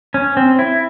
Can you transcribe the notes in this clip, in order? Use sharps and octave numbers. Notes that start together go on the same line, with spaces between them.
C#4
C4
E4